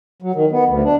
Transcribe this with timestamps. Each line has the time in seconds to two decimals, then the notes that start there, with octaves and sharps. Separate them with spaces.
0.22 F#3
0.35 D#3
0.51 B3
0.68 D2
0.84 D4